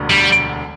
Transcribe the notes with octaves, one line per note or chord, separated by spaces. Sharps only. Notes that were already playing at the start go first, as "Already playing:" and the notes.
Already playing: E1 D2 D3
G3